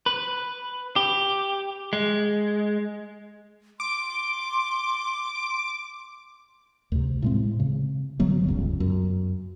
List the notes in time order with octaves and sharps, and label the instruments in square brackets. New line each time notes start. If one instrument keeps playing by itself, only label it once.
[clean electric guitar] B4
G4
G#3
[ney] C6 [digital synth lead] D6
[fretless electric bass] D2 C3
A2 G#3 C4
C#3
G#1 D3 F#3 B3
D1 C#2 G2
F#2